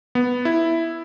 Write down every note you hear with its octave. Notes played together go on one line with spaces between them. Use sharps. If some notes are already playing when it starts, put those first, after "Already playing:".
B3
E4